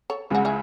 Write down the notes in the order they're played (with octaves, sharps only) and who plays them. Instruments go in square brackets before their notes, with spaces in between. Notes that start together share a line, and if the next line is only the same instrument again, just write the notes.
[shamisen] A4 C#5
[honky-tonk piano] C#2 C#3 G#3 [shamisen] F#4
[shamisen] E4 G#4